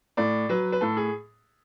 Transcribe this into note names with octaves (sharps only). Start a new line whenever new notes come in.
A2 D5
F#3 B4
B4
A2 A4
G#4